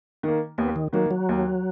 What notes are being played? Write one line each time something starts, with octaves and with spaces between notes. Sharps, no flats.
D#3 A#3
D#2 B3
D#3
D#3 F#3 A#3
F#3
D#2